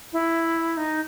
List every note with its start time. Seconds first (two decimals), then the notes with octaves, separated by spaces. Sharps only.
0.13 E4
0.77 D#4